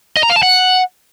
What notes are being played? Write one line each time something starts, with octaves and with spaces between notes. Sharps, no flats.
D#5
A#5
F5
A5
F#5